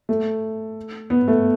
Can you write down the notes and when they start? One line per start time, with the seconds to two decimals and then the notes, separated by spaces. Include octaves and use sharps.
0.09 A3
1.10 B3
1.28 A3